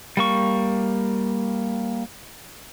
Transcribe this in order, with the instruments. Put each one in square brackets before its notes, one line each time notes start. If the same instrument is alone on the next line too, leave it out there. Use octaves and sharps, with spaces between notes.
[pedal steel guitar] G3 A#3 C#6